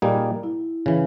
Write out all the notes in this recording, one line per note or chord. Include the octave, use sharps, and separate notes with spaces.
A#2 G3 A#3 D#4 G#4
E4
C#3 E3